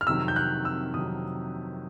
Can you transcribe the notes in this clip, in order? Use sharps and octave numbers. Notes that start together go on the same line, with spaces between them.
F6
F2 C3 D#3 F#3 E6
G6
F#6
E6
F2 C3 D#3 F#3 D#6